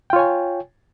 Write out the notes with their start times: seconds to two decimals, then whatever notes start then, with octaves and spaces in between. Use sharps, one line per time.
0.10 G5
0.13 F4
0.16 C#5
0.19 G#5